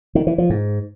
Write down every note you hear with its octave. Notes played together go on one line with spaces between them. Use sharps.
D#3
E3
F3
G#2